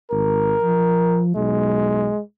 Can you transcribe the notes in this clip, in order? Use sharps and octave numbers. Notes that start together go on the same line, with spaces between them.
G#1 A#4
F3
B1 G#3